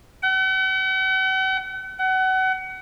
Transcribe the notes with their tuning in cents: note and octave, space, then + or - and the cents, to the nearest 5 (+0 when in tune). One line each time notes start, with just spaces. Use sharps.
F#5 +45
F#5 +30